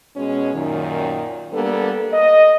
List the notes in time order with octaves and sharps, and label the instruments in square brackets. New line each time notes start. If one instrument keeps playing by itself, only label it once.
[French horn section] B2 G#3 C#4
F#2 A#2 D#3
G3 A#3 B3 D4 A4
D#5